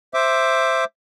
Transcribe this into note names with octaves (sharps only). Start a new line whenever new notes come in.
C5 E5 D6